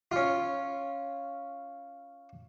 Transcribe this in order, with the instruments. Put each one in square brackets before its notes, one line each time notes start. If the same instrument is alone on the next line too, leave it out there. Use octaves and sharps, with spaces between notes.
[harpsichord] C#4 F4